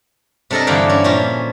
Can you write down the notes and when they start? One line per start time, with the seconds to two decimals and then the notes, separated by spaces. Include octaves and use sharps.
0.51 C3 D4 A4 A#4 D#5
0.67 G2 D3 E3 F5 G5
0.89 C#4 E4
1.04 A#2 F3 C#4 F4